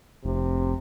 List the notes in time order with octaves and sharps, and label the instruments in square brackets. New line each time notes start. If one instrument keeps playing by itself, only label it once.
[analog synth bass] F1 [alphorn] C3